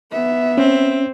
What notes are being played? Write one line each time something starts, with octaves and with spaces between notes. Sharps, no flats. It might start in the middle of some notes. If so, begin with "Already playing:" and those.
B3 E5
C4 C#4